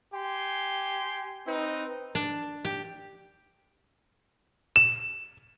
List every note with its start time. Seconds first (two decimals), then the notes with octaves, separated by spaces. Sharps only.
0.14 G4 G#5 C6
1.46 C4 D#4 B4
2.15 D4
2.65 G4
4.76 E7